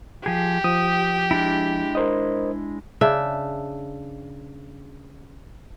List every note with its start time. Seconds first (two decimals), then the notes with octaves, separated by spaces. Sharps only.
0.26 F3 G4 G#4
0.64 F3 D#6
1.31 G#3 D4 E4
1.95 A#4 C5 D#5
3.01 C#3 D4 E5